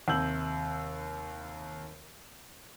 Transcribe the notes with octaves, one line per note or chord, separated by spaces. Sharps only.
D#2 C3 E6 G6 F#7